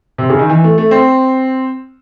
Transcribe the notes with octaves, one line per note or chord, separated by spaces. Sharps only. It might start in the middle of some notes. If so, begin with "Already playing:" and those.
C3
C#3
D#3
E3
A3
A3
C4